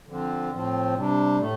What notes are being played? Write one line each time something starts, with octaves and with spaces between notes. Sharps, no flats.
D3 F3 C4
A2 F3 C4
C3 G3 D4
A2 A3